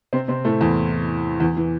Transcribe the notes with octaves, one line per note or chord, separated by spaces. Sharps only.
C3 C4
C3 C4
A2 A3
E2 E3
E2 E3
E3